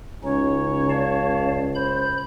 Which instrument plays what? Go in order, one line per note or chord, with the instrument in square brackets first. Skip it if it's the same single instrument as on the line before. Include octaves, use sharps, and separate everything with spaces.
[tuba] C#2 [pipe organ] C#3 C#4 D#4 [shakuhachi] C#5
[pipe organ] D5 F5 A5
[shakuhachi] C5 [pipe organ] B5 G6